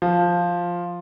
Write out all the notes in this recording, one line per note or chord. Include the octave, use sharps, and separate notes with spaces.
F3